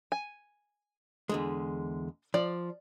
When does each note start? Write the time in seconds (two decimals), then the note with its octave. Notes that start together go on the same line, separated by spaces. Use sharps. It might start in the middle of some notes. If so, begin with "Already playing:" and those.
0.12 G#5
1.29 E2 D3 G#3
2.34 F3 D5